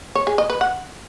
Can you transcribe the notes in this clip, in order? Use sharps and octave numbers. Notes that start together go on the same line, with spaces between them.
C#5
G#4
D#5
B4
F#5